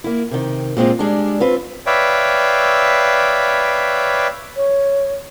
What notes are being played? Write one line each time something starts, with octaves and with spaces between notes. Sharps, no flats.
A#3 E4
C3 D#3
A#2 G#3 C4 F4
G3 G#3 D4
C4 F4 B4
B4 C#5 D5 E5 F5 G5
C#5